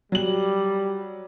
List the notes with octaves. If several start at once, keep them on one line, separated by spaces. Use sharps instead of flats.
F#3 G3 F#7